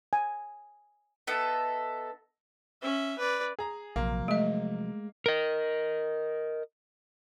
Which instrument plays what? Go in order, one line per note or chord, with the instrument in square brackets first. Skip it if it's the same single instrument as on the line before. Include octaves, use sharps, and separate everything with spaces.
[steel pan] G#5
[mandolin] B3 D#4 A4 E5
[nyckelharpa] C#4 E5
B4 D5
[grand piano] G#4 A#5
[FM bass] A#1 [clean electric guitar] C3 F3 F#3 [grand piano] A#3
[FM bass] G#3 [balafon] A3 D#5
[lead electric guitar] A#4 D#5